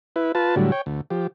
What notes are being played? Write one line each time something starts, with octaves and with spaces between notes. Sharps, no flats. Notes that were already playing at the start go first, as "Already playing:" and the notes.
E4 B4
F4 B4 A5
A2 D3 F#3 G3
C#5 G5
D2
F3 G4